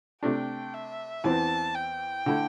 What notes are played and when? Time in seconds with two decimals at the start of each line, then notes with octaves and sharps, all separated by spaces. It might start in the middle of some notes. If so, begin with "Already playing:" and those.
0.23 C3 A3 D4 G5
0.74 E5
1.24 E2 E3 C4 A5
1.75 G5
2.26 D3 A3 E4